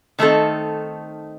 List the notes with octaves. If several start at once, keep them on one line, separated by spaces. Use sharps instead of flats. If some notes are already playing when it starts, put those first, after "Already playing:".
D#3 A3 C4 D#4 A4